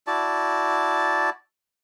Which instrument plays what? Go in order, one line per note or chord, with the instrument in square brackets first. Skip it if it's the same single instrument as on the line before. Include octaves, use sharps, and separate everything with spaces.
[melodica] E4 F#4 D5 A5